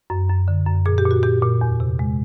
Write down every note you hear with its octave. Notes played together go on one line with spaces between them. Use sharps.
F#2
F#2
D3
F#2
A#2 G#4
G4
A#2
F#4
A#2 G4
A#2
E2
C3
G#3